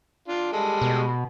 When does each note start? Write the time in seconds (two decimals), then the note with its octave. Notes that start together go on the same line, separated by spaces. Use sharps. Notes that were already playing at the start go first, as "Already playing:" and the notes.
0.28 D4 F4
0.52 G3 G#3 A4
0.81 B2